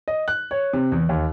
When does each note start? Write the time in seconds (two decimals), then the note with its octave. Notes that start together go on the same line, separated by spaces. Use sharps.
0.08 D#5
0.28 F#6
0.51 C#5
0.73 C3
0.92 E2
1.09 D#2